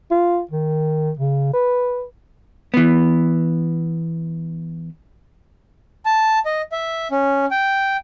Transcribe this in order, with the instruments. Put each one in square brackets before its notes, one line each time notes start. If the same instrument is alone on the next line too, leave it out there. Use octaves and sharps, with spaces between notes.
[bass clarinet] F4
D#3
C#3
B4
[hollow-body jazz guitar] E3 B3
[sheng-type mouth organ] A5
D#5
E5
C#4
G5